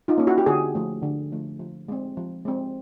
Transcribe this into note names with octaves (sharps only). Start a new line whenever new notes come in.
D#4 F4
A#3 C#4
E4 F#4
G4
D3 F#4 G#4
F3 A3
D3
F3 A3
F3
G#3 C4
F3
G#3 C4